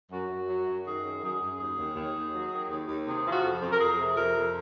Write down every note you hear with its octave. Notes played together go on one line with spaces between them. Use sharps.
F#2 F#4
F#2
F#3
F#2
D#3 G#4
F#2
F#2 G#4
F#2
D#2 G#4
D#2
D#2
D#2
F#3
D#3
D#2
D#2
C3 G#4
F3
F#4
F2
F2
A#4
F2 G#4
C3
F2 A#4
F2